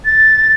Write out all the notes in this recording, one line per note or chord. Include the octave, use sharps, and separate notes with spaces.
A6